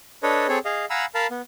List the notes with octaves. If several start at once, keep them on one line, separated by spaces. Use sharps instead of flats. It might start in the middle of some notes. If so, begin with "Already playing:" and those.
D4 A4 B4 C#5 D#5
C4 G#4 A4 C#5
G#4 D#5 F5
F5 F#5 G#5 A#5 B5 E6
A#4 F5 A5 B5
B3